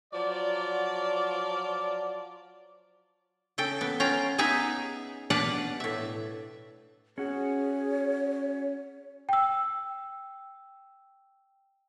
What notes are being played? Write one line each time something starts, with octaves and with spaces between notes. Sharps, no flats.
F3 F#3 D5
C#3 A4 G5
B3
C#4 F4 G5 A#5
B3 D#4 G#4 E5 A#5
B2 D4 B4 F5 F#5
A2 E5
C#4 F#4 G#4 C#5
G5 E6